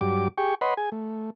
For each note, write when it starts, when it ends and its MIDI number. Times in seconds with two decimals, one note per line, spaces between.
0.01 0.28 43
0.01 0.28 54
0.01 0.28 67
0.01 0.28 86
0.38 0.55 67
0.38 0.55 68
0.38 0.55 79
0.38 0.55 85
0.61 0.74 71
0.61 0.74 73
0.61 0.74 75
0.61 0.74 78
0.61 0.74 83
0.61 0.74 84
0.77 0.90 68
0.77 0.90 80
0.92 1.30 57